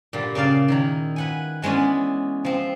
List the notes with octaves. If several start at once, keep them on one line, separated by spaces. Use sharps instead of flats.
A#2 D3 G3
C#3 A#3 D5 F5
D#3 E4 A#5
B4 F#5 G#5
E3 G#3 B3 C#4 D4
F3 C4